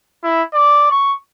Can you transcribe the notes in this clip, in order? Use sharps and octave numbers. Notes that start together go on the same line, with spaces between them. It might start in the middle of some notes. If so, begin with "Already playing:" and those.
E4
D5
C#6